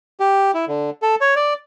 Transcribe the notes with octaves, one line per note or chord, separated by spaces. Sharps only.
G4
E4
D3
A4
C#5
D5